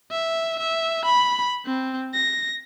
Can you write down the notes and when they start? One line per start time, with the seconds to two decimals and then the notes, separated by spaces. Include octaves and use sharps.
0.11 E5
0.59 E5
1.05 B5
1.66 C4
2.15 A#6